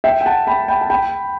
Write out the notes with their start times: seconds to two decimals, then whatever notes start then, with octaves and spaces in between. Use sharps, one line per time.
0.04 E5 G5
0.21 G5
0.26 F#5 A5
0.47 G5 B5
0.68 G5 B5
0.81 A5
0.90 G5 B5